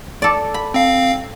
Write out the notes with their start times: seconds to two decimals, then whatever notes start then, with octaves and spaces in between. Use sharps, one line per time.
0.22 A4 D5
0.54 B5
0.74 C4 F5